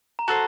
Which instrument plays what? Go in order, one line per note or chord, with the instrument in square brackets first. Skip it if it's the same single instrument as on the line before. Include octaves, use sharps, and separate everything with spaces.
[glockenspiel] A#5
[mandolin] F#4 A4 C5 [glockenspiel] A5